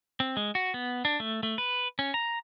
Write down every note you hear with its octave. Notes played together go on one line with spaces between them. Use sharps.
C4
G#3
F#4
B3
D4
A3
A3
B4
C#4
A#5